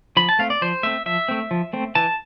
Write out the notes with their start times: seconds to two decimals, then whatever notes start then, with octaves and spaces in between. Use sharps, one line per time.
0.17 F3 B5
0.29 A5
0.39 A3 C4 F5
0.50 D5
0.62 F3 C5
0.83 A3 C4 E5
1.06 F3 E5
1.28 A3 C4
1.51 F3
1.73 A3 C4
1.95 E3 A5